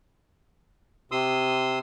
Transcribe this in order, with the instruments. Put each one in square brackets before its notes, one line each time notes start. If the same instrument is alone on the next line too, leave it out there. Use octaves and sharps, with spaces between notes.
[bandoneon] C3 C6 D#6 E6